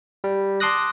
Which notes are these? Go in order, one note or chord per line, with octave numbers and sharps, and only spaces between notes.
G3
A5 C6 D6 D#6 F#6 A#6